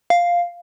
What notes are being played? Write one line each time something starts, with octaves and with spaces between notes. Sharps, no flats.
F5